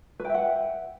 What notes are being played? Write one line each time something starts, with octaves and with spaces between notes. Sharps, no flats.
B4 E5 F#5 G5